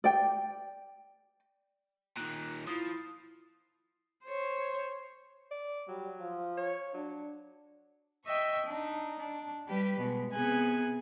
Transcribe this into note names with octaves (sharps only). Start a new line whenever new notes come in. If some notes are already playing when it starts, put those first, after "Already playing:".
D5 G5
A#2 D#3 F#6
F3 E4 D#6 A6 C7
C5 C#5
D5
F#3 G3
F3
C#5
F#3 D4
D#5 E5 G5 C#6
D4 D#4
D4
G3 G4 B4
B2 G#3
C3 B3 G#4 G#5 F#6